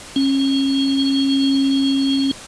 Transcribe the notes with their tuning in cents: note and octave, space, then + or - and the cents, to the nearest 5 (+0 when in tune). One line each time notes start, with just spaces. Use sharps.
C#4 -30